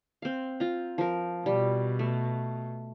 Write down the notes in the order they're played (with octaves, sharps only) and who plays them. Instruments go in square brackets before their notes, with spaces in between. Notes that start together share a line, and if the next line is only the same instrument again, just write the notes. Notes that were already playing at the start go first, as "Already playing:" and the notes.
[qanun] C4 F5
F4 A#5
F3 A#4
[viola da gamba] B2 [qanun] G3
[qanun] A3